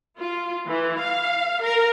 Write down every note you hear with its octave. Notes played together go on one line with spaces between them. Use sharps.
F4
E3
F5
A#4